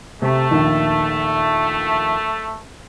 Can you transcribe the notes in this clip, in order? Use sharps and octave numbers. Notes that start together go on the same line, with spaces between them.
C3 A3
A#1 D#2